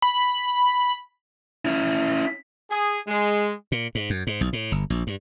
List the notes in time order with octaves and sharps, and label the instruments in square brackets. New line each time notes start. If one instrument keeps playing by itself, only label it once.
[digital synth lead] B5
[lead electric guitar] C#4 E4
[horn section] G#4
G#3
[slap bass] A#2
G#2
F#2
G#2
B1
A2
G1
A#1
G2